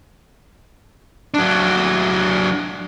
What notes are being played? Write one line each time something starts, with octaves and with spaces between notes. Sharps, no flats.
F#3 D4